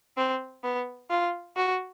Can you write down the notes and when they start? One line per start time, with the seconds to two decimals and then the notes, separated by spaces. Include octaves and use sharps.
0.17 C4
0.64 B3
1.10 F4
1.57 F#4